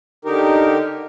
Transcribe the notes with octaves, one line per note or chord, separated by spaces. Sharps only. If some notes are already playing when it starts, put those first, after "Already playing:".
D3 D#4 G4 A#4